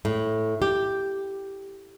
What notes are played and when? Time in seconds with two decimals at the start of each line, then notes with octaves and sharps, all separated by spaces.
0.05 A2
0.62 G4